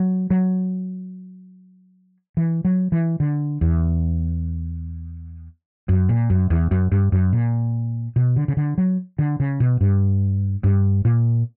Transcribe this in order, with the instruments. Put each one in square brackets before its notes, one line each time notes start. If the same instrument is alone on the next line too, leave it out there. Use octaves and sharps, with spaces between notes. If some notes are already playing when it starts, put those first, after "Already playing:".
Already playing: [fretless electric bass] F#3
F#3
E3
F#3
E3
D3
E2
F#2
A#2
F#2
E2
F#2
G2
F#2
A#2
B2
D3
C#3
D3
F#3
D3
C#3
B2
G2
G2
A#2